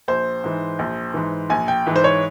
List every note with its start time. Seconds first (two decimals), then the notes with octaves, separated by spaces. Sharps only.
0.08 A#1 C5
0.44 G#2 E3
0.79 A#1
1.14 G#2 E3
1.50 A#1 G#5
1.68 G5
1.86 G#2 E3
1.96 C5
2.04 C#5